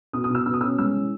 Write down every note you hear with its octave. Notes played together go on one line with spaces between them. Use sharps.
B2 D#6
D#6
B2 E6
B2 E6
D#6
C#4 E6
G#3 E6
E3